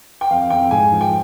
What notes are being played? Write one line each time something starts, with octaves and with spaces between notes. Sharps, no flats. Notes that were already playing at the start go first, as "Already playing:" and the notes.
G5
F2 F5
F2 G5
G#2 G#5
F3
G5